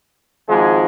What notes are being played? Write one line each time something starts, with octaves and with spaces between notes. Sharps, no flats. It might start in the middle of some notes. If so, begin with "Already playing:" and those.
G#1 G#2 F3 G#3